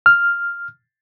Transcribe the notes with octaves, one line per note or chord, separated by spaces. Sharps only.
F6